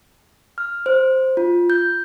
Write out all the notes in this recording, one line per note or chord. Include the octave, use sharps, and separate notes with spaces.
F6
C5
F4
G6